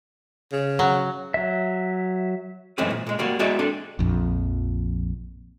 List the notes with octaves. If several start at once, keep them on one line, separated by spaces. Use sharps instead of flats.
C#3
F#3
F#3 E5
F#2 E3 G#3 A3 C4 C#4
A#2
A#2 G#3
G3 A#3 F#4
G#3 B3 E4 F#4 D5 E5
C4 D4 A4
A#1 F2